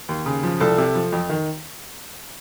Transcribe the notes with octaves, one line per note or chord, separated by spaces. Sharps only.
D#2
C#3
F3
C2 A4
C3
F3
F2
D#3